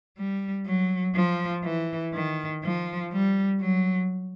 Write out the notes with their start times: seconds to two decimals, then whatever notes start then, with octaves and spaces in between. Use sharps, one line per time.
0.18 G3
0.66 F#3
1.15 F3
1.64 E3
2.13 D#3
2.63 F3
3.12 G3
3.61 F#3